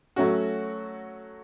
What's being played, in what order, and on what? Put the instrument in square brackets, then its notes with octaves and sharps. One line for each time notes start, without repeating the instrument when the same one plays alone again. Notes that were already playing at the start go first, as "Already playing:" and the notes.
[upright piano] F#3 A3 C#4 F#4